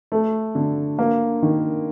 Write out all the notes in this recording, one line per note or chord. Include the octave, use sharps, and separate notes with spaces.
A3
D3
A#3
D#3